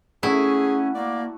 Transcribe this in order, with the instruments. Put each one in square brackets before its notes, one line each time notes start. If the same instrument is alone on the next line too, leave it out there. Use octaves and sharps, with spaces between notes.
[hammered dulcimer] A3 F#4 [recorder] C#4 [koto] E4 [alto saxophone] G#4
[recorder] A#3 [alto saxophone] D5